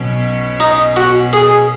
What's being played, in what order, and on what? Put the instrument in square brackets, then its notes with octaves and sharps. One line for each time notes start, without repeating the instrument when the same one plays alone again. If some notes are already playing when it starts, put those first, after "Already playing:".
Already playing: [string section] B1 B2 F#3 C#4
[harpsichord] D#4
F#4
G#4